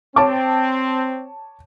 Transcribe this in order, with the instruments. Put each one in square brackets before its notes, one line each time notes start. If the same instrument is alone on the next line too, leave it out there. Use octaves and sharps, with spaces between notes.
[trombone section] C4 [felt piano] C#5 A5 D6